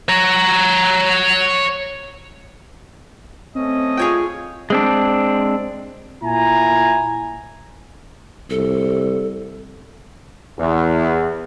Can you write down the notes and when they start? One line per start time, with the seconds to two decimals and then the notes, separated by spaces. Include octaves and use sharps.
0.09 C#5 A#5
3.55 A3 C4 C#4 D#5
3.97 F4 G#4 C#5 G5
4.70 G#3 C4 D4
6.23 A#2 E4 G#5 A#5
8.50 C2 A4
10.58 E2